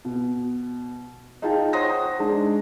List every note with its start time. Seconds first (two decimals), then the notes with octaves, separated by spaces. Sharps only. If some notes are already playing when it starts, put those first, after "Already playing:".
0.05 B2
1.42 D#4 F4 G#4 F5 G5 A5
1.73 C5 C#5 F#5 C6 D#6 A#6
2.19 G#3 D4 D#4